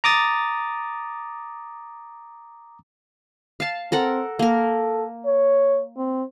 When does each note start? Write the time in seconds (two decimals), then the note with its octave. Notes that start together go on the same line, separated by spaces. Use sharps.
0.04 A#5 D6 D#6 A6
3.60 F5 A5
3.92 C4 A4 A#4 F#5
4.39 A#3 A4 A#4
5.25 C#5
5.97 C4